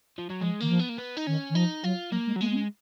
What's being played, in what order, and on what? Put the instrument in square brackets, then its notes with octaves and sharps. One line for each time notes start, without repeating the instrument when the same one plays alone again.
[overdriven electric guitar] F3
F#3
[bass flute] F3 [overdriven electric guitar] G#3
[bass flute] D#3 [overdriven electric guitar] A#3
[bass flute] F3
[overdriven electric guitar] B3
A#3
B3
D#4
[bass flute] D#3 [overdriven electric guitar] C#4
[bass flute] D#3
[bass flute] F3 [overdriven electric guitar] D#4
[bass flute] F#3 [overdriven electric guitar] F4
[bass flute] F#3 [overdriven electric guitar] A#3
[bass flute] G#3
[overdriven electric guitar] F#3
[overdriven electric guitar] G#3 [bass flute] A#3
[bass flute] B3
C#4